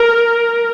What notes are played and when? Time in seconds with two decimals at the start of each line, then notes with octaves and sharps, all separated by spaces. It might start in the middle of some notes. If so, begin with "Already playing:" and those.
Already playing: A#4